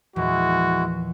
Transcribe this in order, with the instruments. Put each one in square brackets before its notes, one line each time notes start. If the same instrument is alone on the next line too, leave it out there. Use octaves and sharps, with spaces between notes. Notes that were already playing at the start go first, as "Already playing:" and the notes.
[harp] E2 A#2 F3 [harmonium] G#3 E4 [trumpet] F#4